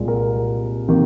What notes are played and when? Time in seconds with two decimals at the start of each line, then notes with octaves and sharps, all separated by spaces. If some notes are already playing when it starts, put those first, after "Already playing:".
Already playing: C2 A#2 G#3
0.08 A#4
0.88 C3 D#3 A#3